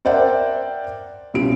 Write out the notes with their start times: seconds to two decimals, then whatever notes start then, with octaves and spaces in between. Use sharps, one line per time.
0.05 A#4 C5 D5 E5 F#5 G5
1.34 C2 B2 C#4 F4 D7